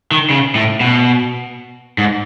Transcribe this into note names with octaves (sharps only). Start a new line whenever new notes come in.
D#3
C#3
A2
B2
G#2